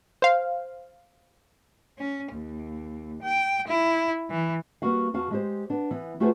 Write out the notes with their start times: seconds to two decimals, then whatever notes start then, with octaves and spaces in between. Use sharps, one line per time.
0.22 C5 F5
1.97 C#4
2.32 D#2
3.22 G5
3.67 E4
4.30 E3
4.82 G3 A#3 B3 F#4 F5
5.14 E2 F#4 F5 A5
5.31 G#3 G4 C5
5.70 B3 D4
5.91 E3 B3
6.20 A3 F4 F#4 G#4 B4 C5